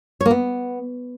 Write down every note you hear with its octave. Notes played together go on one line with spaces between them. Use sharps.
C#5
A#3
B3